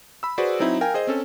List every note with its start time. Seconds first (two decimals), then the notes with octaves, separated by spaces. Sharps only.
0.23 B5 E6
0.38 F#4 G#4 B4 C5 D5
0.60 F#3 C4 D#4 E4
0.81 A#4 F5 G5 G#5
0.94 G#4 C5 D#5
1.07 C4 C#4 A4